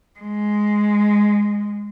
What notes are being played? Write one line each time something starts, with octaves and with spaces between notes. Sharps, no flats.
G#3